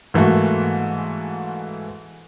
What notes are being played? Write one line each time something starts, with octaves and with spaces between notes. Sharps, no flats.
G#2 E3 A3 A#3 F#4